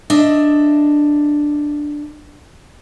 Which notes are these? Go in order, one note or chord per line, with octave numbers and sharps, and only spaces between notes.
D4 D#5 E5